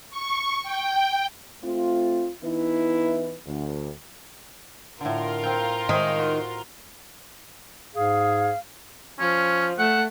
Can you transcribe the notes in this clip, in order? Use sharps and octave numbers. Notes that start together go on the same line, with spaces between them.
C#6
G5
A3 C4 F4
E3 B3 D#4 E4 B4
D2
A2 D3 F4 A#4
C4 G5
A2 D#3 G#3 C5
F#4
G#2 G#4 F5
F3 C#4
A3 F#5